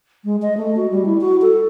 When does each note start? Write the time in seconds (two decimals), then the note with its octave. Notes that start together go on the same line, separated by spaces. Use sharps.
0.25 G#3
0.42 D#5
0.57 A3
0.76 F#4
0.91 G3
1.06 E4
1.21 F#4
1.42 A4